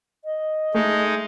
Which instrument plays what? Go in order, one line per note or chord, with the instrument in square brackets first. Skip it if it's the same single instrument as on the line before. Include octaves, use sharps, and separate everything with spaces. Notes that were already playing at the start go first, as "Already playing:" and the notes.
[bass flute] D#5
[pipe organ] G#3 D#4 [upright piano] A3